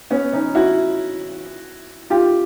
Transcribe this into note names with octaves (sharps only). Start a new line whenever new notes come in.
B3 C#4
C#4 D#4
E4 F#4
F4 G4